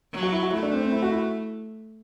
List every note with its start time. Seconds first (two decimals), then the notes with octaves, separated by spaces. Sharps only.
0.13 F#3
0.23 F#4
0.33 E4
0.43 F#4
0.53 A3 E4
0.63 D4
0.73 C4
0.83 C4
0.92 E4
1.03 F#4
1.12 E4